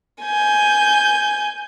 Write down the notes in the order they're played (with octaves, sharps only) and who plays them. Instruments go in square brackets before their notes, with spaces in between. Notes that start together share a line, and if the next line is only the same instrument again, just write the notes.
[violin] G#5 G6